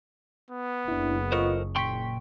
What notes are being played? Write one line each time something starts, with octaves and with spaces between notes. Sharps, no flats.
B3
F#1 D4 E4
F4 A4 A#4 C5 D#5 C#6
A#2 G5 C6 C#6 B6